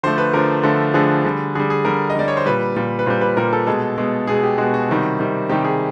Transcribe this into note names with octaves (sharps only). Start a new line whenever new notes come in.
D3 F3 A3 C5
B4
D3 F3 A3 A#4
D3 F3 A3
D3 F3 A3 G#4
D3 G3
D3 G3 G#4
G#4
D3 G3 A#4
D#5
D3 G3 D5
C#5
C5
A#2 G3 B4
A#2 G3
B4
A#2 G3 C5
B4
A#2 G3 A#4
A4
B2 G#3 A4
B2 G#3
B2 G#3 G#4
G4
B2 G#3 F#4
F#4
C3 D#3 G3
C3 D#3 G3
C3 D#3 G3 G4
G#4